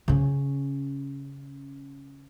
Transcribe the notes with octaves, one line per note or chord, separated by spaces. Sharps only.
C#3 C#4